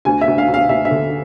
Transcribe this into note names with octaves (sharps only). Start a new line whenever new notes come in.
D2 G#5
E5
D2
F5
D2
F5
D2 E5
E5
D3